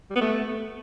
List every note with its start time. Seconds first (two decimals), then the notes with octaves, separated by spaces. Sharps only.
0.10 G3
0.16 B3
0.21 A3